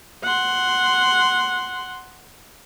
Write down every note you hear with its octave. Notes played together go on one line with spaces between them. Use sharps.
F#5 C6